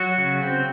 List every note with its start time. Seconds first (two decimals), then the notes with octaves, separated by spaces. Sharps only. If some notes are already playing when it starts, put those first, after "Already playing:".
Already playing: F#3 F#4
0.18 C#3
0.43 C4